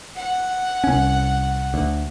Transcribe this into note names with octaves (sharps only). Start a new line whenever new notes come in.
F#5
C2 C#4
D2